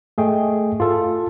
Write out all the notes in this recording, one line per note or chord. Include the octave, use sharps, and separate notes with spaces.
A3 G#4 D#5 G5
F4 A4